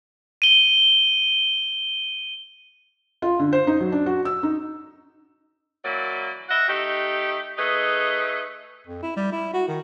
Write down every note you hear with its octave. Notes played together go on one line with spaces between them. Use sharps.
D#7 G7
F4
D3
C5
D#4
F#3
D4
F#4
E6
D#4
E3 F#3 A#3 D5
D#5 E5 F#5
A3 D#4 G4
A3 D#4 G#4 B4
F2
E4
G3
E4
F#4
D#3